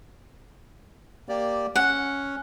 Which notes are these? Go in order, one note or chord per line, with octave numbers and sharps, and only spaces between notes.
A#3 G4 D5
C#4 F#5